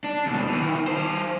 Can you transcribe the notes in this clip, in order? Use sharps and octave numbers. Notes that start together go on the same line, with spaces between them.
D4
D#2 B2
D#3 E3
E3 C5